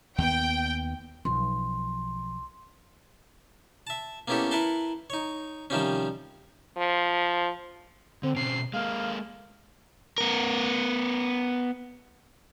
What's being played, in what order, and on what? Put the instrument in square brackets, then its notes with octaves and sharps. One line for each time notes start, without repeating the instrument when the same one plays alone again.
[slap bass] D#2 B3 [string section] G5
[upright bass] B1 F3 [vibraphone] C6
[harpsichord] E5 A5
A#3 B3 C#4 E4 G4 A4
E4 A#4 B4 F#5 A5 C6
D#4 C#5
C3 D#3 F3 G3 C4 C#4
[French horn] F3
[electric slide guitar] D3 [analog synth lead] C4
[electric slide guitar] B2 C4 C#4 [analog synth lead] C7
[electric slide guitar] G#3 A#3 [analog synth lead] F5
[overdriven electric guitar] B3 A#4